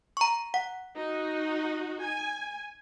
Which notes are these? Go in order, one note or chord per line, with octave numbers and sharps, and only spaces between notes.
A#5 C#6
F#5
D#4 F#4
G#5